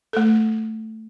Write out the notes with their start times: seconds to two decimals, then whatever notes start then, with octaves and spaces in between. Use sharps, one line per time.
0.13 A3 A4